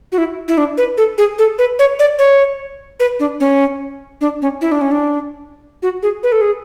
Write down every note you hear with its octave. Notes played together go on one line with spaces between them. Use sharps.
F#4
E4
E4
D4
B4
A4
G#4
A4
B4
C#5
D5
C#5
B4
D4
C#4
D4
C#4
E4
D4
C#4
D4
F#4
G#4
B4
A4
G#4